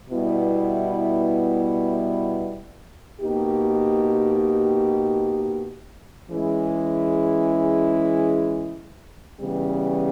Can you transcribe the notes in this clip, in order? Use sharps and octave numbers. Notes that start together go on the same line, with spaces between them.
B2 G3 B3 E4
B2 A#3 D#4 G4
E3 G#3 C#4 E4 G#4
C#3 E3 G3 B3 G4